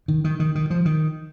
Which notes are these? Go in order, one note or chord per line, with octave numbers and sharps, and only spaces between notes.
D#3
D#3
D#3
D#3
F3
D#3